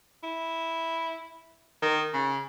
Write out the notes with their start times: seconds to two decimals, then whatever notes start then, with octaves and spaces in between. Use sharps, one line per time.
0.23 E4
1.82 D#3
2.13 C#3